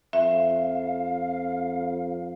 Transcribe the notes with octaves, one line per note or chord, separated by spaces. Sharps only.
F2 E5 F5